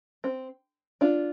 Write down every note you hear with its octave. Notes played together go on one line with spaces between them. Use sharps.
C4
D4 F4